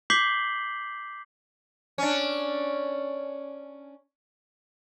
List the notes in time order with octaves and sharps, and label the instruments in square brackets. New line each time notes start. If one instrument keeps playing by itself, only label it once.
[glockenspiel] D6 G6 B6 C7 F#7 G7
[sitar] C#4 D4